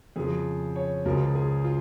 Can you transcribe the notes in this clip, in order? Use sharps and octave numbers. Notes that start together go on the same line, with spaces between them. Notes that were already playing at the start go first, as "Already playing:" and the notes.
F2 C#3 F3 G#4
C#5
C#2 C#3 F3 A#4
G#4
F4